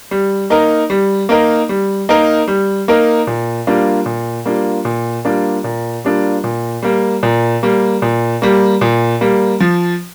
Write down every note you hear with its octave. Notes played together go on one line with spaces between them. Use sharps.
G3
A#3 D#4 A#4
G3
A#3 D#4 A#4
G3
A#3 D#4 A#4
G3
A#3 D#4 A#4
A#2
G3 A#3 D4 F4
A#2
G3 A#3 D4 F4
A#2
G3 A#3 D4 F4
A#2
G3 A#3 D4 F4
A#2
G3 A#3
A#2
G3 A#3
A#2
G3 A#3
A#2
G3 A#3
F3